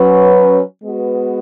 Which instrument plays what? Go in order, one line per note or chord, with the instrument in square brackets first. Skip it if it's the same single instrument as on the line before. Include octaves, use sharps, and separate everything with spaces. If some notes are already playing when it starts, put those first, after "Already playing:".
Already playing: [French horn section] F#3 C#4 B4
G#3 B3 F#4 B4